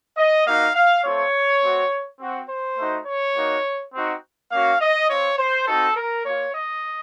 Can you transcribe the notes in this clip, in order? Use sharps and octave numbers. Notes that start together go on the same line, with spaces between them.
D#5
A#3 D#4 F#4 F5
F5
A3 C4 F4 C#5
A3 C4 F#4
C4 F#4
C5
A3 D#4 F#4
C#5
A#3 D#4 F#4
C4 D#4 F#4
A#3 C#4 F#4 F5
D#5
C4 F4 C#5
C5
C4 D#4 F#4 A4
A#4
A#3 F4 C#5
D#5